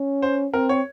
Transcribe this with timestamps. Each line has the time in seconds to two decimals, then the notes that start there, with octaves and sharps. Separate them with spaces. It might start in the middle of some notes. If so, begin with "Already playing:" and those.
Already playing: C#4
0.22 C5
0.53 C4 A#4
0.69 C#5